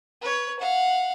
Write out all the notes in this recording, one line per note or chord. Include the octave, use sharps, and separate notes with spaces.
B4 C#5
F5 F#5